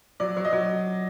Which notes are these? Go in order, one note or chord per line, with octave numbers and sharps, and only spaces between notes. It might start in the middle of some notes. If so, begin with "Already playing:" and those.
F#3 D5
F#3
D#5
F#3